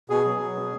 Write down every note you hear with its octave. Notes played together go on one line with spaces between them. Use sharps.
B2 G#4
F#3
F#3
B2